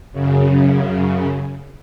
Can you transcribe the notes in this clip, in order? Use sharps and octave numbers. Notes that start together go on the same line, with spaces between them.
F#2 C#3